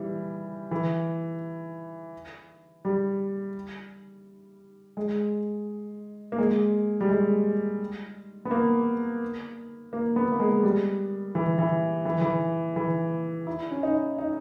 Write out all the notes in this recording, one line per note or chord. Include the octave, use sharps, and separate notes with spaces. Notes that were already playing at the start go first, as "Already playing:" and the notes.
Already playing: E3 G3
E3
G3
G#3
A#3
G#3
G3
G#3
B3
A#3
A#3
B3
A#3
G#3
G3
E3
E3
E3
E3
E3
E4
C#4
D#4
D#4